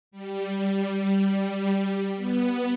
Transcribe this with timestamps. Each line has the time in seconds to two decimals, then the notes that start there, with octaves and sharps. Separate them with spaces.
0.11 G3
2.16 B3